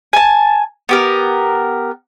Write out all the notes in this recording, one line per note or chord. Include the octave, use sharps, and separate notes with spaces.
G#5 A5
B3 G4 A#4